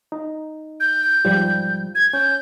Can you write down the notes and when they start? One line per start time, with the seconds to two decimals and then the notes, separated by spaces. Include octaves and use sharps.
0.12 D#4
0.80 G6
1.25 G#2 F3 G3
1.95 G#6
2.13 C#4 G6